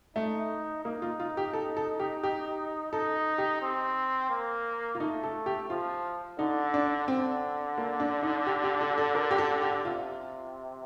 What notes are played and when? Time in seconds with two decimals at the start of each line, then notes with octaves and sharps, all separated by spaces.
0.16 A3 D#4
0.85 A#3 D#4
1.02 F4
1.20 F4
1.37 G4
1.53 A4
1.77 A4
2.00 G4
2.23 G4
2.92 D#4 A4
3.38 G4
3.62 C4
4.30 A#3
4.95 F4
5.00 A3 D#4
5.23 A4
5.46 G4
5.69 F3 F4
6.38 D3 D#4
6.74 D4
7.08 D3 C4
7.78 A#3
8.00 D4
8.23 D#4
8.47 G4
8.64 G4
8.81 A4
8.98 A4
9.15 A#4
9.31 G4
9.38 A4
9.62 G4
9.85 C3 F4